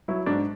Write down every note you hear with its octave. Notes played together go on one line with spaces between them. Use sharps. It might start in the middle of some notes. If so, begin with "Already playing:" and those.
F#3 E4
G#2 D4